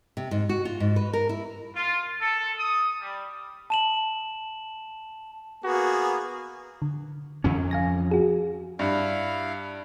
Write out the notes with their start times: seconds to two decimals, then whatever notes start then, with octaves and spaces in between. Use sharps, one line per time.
0.17 C3
0.31 G#2
0.49 F#4
0.65 F4
0.80 G#2
0.96 B4
1.13 A#4
1.29 E4
1.75 F4
2.20 A4
2.59 D#6
3.01 G3
3.70 A5 E7 F#7
5.64 A#3 B3 F#4 G#4
6.82 D3
7.44 F2 D3 E3 F3 C#4
7.71 F5 G#5 A#6
8.11 F#4 G#4
8.79 G2 E4 F5